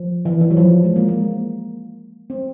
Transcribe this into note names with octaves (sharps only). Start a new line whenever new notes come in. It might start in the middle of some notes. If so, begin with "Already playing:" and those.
Already playing: F3
E3
E3
F#3
F3
G#3
A#3
A#3
C4